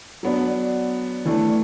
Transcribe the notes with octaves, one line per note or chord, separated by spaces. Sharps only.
F#3 B3 D4
E3 A3 D4